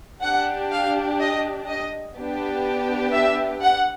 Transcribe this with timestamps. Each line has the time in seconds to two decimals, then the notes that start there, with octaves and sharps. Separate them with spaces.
0.23 D4 G4 F#5
0.72 F5
1.20 D#5
1.69 D#5
2.17 B3 D4 G4
3.14 E5
3.62 F#5